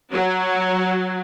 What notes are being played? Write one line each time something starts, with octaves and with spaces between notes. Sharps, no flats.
F#3